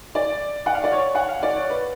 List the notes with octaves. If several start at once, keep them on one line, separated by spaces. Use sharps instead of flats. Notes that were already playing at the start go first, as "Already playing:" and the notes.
D5
F#5
F5
D5
C#5
F#5
F5
D5
C#5
B4